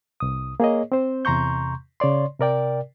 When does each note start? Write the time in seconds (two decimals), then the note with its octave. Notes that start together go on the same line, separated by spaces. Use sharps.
0.20 C2 D#6
0.60 A#3 G#4 C#5 D#5
0.92 C4 C5
1.25 E2 C3 A#5 C6 C#6 G6
2.00 C#3 C#5 D5 C6
2.40 C3 A#4 D5 G5